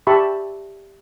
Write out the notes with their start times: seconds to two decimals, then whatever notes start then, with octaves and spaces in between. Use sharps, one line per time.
0.07 G4 E5 A5 B5 C#6